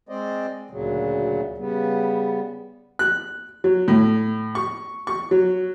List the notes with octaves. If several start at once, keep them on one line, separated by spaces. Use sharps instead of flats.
G#3 C4 C5 D5 D#5
D2 A#2 C#3 F#3
C#3 G3 B3
F#6
F#3
A2
C#6
C#6
F#3